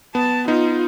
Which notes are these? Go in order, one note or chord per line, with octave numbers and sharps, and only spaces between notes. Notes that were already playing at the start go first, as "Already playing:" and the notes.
B3 A5
B3 D#4 F4